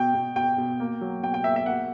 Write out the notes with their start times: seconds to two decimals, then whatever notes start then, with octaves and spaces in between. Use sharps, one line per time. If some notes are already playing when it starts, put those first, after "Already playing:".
Already playing: B2 G5
0.14 B2
0.36 B2 G5
0.58 B2
0.80 A#3
1.01 F#3
1.23 B2 G5
1.34 G5
1.44 A#3 E5
1.56 E5
1.66 A#3 F#5